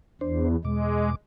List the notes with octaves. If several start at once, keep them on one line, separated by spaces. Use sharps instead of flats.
E2 D4 C5
E2 B2 G#3 D6